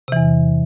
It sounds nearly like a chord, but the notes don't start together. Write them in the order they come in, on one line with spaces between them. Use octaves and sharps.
C3 E3 E2